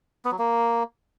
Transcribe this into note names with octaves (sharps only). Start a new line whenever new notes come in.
B3
F#3
A#3